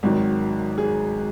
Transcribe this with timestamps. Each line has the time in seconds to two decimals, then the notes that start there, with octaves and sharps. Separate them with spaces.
0.03 G#1 G#2 D#3 F#3
0.78 G#4